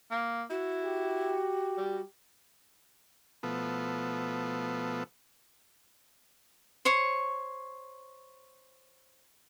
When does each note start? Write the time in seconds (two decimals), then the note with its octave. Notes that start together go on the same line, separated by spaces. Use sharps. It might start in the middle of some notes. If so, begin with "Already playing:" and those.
0.11 A#3
0.50 E4 F#4
0.84 G4
1.78 G3
3.43 B2 F3 A3 B3
6.85 C5 C#5 C#6